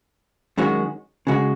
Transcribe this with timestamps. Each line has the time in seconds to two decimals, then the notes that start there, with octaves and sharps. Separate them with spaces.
0.58 F#2 D#3 G#3 C#4 F#4
1.27 C#3 G#3 F#4